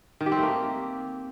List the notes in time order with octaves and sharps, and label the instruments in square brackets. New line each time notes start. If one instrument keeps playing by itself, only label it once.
[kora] D#3
G4
C4
A3
A#3